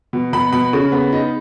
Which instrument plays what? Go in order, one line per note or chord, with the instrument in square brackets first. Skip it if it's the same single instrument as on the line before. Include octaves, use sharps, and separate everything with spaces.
[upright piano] B2
B2 B5
B2 B5
C#3
B3
D#4